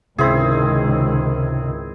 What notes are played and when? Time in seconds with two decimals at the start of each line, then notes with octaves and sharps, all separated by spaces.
0.18 C#2 G#2 C3 D#3 C4 C#4 E4 G#4